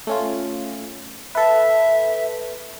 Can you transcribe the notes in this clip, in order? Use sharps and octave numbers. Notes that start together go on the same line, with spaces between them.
A3 C#4 F4
A4 B4 E5